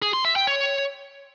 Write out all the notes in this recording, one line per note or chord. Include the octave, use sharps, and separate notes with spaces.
G#4
C6
E5
G5
C#5